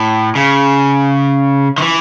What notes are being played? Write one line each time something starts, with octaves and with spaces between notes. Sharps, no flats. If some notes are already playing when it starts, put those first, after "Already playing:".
Already playing: A2
C#3
D#3
E3